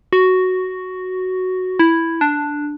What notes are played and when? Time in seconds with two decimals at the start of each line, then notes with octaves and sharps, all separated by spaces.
0.13 F#4
1.79 E4
2.21 D4